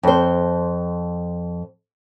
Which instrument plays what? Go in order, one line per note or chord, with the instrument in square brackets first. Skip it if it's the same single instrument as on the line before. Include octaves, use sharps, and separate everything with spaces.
[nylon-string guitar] F2 C5